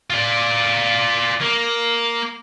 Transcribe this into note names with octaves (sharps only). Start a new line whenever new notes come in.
F4 D5
A#3